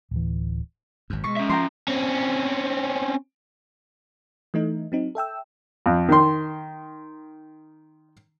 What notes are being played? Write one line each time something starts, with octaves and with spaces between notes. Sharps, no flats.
D1 E3
G#1 F#2
B2 G#3 C#6 C#7
C#4 E5
F3 G5 A#5 C6
C4 C#4
E3 A3 D#4
F#3 C4 D#4
A4 E5 G5 E6
F2
D#3 C6